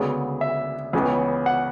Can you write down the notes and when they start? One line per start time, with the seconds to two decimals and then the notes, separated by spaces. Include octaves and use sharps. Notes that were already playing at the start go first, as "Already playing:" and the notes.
Already playing: D2 C#3 G#3 B3
0.41 E5
0.93 C#2 C#3 E3 B3
1.46 F#5